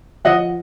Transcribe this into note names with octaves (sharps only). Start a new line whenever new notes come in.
F3 D#5 F#5